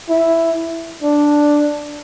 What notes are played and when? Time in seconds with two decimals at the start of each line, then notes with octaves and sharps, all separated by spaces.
0.09 E4
1.03 D4